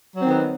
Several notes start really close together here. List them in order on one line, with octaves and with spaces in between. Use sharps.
F#3 C4 D#3 B3